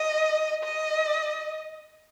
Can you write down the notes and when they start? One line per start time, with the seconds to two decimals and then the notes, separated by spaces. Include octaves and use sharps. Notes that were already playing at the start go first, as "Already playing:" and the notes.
Already playing: D#5
0.63 D#5